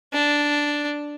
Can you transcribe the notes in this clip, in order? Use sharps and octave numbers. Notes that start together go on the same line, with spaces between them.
D4